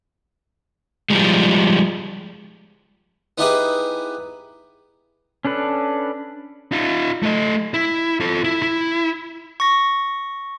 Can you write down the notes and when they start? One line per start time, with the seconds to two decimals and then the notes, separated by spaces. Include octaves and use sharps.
1.10 F3 G3 G#3
3.38 B3 D#4 E4 G4 G#4 B4
5.45 C#4 D4 A4 B4
6.72 D#4 F4
7.23 A3 D#5
7.74 E4
8.20 F4 A4
8.44 E4
8.62 E4
9.60 C#6 A#6